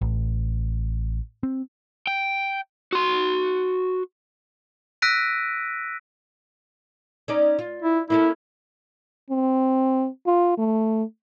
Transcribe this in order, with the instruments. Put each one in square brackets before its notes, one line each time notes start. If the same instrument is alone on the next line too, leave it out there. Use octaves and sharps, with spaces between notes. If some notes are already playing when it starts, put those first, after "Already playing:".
[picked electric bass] A1
C4
[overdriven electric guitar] G5
F#4 C6
[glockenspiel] E6 F#6 A#6 B6 D7 D#7
[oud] C#4 D#4 D5
F4
[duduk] E4
[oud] A#3 C#4 A4 [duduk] E4
[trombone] C4
F4
A3